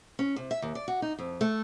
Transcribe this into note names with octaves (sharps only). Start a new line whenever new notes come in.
C#4
C3
E5
D#2
D5
F#4
D#4
F2
A3